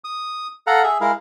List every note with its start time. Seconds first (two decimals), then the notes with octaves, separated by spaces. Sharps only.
0.04 D#6
0.67 A4 F5 F#5 A#5
0.84 G#4 E5
1.01 G#3 E4 A#4 F5